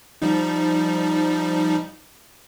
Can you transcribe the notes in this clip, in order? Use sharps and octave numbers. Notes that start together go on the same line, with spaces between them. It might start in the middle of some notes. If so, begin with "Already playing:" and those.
F3 G3 D#4